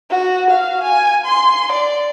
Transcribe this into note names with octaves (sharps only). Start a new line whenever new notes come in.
F#4
F5
G#5
C6
D5